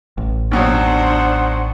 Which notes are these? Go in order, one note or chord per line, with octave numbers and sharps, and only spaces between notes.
A1
D#2 B2 F#3 D4 C5 F#5